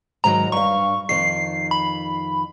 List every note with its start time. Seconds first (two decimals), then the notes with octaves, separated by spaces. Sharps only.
0.24 G#2 D#3 F#3 A#5
0.52 G2 F5 C#6
1.09 F2 D#3 C7
1.71 B5